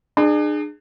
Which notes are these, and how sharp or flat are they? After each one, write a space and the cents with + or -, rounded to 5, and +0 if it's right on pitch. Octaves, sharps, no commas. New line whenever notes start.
D4 +40 G#4 +0